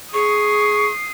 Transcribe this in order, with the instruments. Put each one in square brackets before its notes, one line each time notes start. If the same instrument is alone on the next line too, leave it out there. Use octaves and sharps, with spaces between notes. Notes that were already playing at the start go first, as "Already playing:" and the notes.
[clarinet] G#4 [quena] C#6 [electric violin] D#6 C7